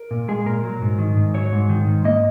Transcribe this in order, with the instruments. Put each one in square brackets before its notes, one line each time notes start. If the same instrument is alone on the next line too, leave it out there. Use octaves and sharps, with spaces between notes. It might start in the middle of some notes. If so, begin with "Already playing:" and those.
Already playing: [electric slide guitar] A#4
A#2
G#3 G#4
A#2 A#4
F#3
G#2
D#3
G#2
F#3 C#5
G#2
D#3
G#2
A#3 D#5